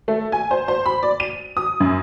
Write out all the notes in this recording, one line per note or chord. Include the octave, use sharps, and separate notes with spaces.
A3
G#5
C5
C5
B5
D5
D#7
D#6
F#2